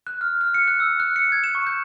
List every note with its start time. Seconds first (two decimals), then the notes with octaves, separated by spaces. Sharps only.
0.07 F#6
0.21 F6
0.41 F6
0.54 C#7
0.68 F#6
0.80 E6
1.00 F#6
1.16 C#7
1.32 G#6
1.44 E7
1.55 C#6
1.67 G6